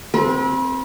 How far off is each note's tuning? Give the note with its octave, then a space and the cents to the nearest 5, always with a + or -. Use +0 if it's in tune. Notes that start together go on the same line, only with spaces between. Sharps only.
C4 +0 B4 -40